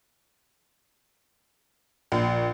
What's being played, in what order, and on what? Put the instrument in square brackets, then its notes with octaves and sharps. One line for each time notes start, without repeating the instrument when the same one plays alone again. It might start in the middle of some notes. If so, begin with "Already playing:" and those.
[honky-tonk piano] A#1